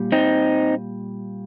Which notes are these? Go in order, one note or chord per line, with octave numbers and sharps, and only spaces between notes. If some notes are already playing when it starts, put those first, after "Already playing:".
Already playing: A#2 G3
C4 D#4